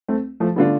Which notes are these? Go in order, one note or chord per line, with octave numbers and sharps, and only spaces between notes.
A3 C4
F3 A3
D3 G3 A3 B3 D4 F4